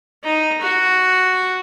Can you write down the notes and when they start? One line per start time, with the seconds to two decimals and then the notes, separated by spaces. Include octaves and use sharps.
0.24 D#4
0.61 F#4